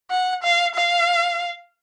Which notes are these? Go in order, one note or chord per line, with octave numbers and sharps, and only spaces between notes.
F#5
F5
F5